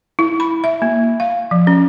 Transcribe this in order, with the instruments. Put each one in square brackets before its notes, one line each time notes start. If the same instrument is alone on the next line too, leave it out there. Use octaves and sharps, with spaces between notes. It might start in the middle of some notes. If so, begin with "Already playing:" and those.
[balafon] E4
B5
E5
A#3
F5
F3
C#4